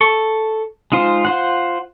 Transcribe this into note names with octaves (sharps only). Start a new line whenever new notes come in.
A4 C#6
G#3 D#4 F4 C5
F4 C5 F#5